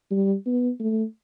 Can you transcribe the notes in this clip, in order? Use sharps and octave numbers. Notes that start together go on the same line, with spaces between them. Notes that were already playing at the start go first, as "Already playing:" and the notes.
G3
B3
A3